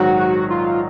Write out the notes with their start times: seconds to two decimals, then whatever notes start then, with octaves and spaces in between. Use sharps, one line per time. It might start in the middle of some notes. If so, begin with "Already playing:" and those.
Already playing: A#1 G#2 D#3 F#3 F#4
0.50 F4